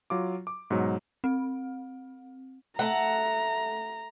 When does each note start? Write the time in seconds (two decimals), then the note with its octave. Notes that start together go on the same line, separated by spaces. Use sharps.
0.10 F#3 F4 D6
0.47 D6
0.70 G#2 B2 F#3
1.24 C4
2.79 A3 F#5 A5 A#5